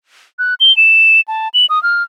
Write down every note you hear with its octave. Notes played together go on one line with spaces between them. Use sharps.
F#6
G7
E7
A5
F#7
D#6
F6